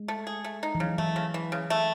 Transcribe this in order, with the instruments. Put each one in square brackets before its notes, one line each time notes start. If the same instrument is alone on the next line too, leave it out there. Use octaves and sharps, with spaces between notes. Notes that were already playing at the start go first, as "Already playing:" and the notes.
Already playing: [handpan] G#3
[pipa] A3
G#4
A3
D#4
[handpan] E3
[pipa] C#3 [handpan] F#3
[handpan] E3 [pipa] A3
[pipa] C#3
E3
C#3
A3